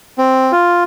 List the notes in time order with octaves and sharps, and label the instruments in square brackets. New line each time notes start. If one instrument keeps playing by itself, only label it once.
[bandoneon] C4
F4